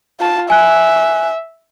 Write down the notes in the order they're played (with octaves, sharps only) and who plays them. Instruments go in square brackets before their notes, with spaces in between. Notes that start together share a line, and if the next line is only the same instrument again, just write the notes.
[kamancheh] F4 A5
[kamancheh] E5 [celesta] G#5 F#6